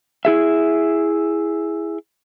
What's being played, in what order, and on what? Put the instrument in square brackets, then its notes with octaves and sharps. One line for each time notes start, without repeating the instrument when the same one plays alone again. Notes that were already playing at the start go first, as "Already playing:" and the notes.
[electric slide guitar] E4 G#4 E5